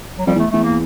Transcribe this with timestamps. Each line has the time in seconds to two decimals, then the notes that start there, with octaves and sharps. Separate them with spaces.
0.19 F#3
0.27 F2 G3
0.35 E2
0.39 A3
0.52 E2 A3
0.64 A#3